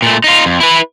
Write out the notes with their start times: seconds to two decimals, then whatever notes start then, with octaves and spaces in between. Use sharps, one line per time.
0.02 A#2 A3
0.24 D#4 F4
0.46 F2
0.60 E4 B4